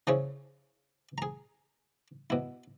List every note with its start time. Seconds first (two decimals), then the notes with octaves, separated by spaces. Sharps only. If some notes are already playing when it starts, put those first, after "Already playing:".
0.07 C#3 F3 E4 G#4 C#5
1.18 G#4 A#5
2.30 B2 E4